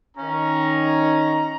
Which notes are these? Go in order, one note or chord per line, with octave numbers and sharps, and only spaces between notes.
D#3 C#4 A#5